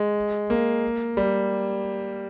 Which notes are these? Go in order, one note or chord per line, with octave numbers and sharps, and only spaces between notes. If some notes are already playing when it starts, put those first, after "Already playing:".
Already playing: G#3
A#3
G3